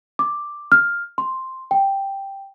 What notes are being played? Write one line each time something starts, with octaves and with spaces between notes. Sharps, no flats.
D6
F6
C6
G5